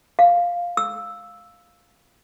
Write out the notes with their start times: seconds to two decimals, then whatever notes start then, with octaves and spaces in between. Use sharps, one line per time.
0.19 F5
0.77 E6